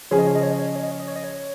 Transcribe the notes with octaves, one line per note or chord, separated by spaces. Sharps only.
C#3 F3 C#4 G#4 C#5
D#5
C#5
D#5
C#5
D#5
C#5
D#5
C#5
D#5
C#5
D#5
C#5
D#5
C#5